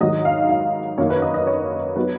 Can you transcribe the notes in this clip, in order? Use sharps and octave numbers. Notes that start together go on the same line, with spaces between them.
G#2 D#3 F#3 D#5
F5
F5
F#2 D#3 A#3 D#4 C#5
B4
D#5
D#5
C#5
F#3 B3 D#4 B4